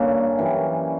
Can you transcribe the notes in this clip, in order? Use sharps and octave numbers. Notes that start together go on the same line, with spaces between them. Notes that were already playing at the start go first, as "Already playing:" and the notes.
Already playing: G2 D3 A#3 C#4
F#2 E3 G3